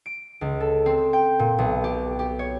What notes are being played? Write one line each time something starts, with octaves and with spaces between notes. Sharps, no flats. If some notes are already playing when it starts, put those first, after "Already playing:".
D7
C#2
A4
C4
G5
A#2
B1
G4
G4
C#5